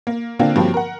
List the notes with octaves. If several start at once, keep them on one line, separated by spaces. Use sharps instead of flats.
A#3
D3 A#3 C4 D4 F4
G2 F3 F#3 A#3 C4
A#4 F#5